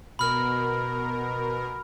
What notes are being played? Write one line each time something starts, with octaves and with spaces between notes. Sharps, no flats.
B2 A#4 B5 F6